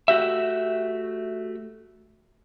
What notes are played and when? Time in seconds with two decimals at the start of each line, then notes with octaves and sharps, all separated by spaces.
0.08 A3 F#4 G4 E5